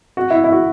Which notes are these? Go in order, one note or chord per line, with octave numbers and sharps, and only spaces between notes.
F#4
E4
E4
F#4